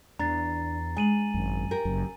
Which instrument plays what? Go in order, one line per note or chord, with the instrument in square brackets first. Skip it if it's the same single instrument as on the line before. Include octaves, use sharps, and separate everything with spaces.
[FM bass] E2 [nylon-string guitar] D4 [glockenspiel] A#5 A6 C7
[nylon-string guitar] G#3 [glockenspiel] G#5 D#7 F#7
[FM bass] G#1 [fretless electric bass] F#2
[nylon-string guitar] G4 A#4
[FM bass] F#1 [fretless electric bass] F#2